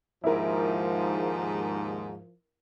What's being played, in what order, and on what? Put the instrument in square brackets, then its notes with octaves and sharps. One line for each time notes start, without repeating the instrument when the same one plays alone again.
[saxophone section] D#2 G#2 [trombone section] F3 [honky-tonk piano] E4 A#4